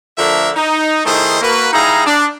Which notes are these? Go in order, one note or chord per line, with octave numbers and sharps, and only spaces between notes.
D3 F3 A3 D4 A#4 E5
D#4
D#3 A3 D#4 E4 G#4 C5
A#3 F#4 B4
G3 D#4 E4 G#4 F5 A#5
D4